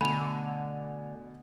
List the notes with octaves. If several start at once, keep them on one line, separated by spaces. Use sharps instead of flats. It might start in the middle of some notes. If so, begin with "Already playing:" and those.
B2 D3 A3 F#5 G#5 B5 D#7 F7